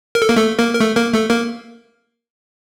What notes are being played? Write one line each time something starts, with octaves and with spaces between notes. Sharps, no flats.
A#4
A4
A#3 A#4
A3 A4
A#3 A#4
A#4
A3 A4
A#3 A#4
A3 A4
A#3 A#4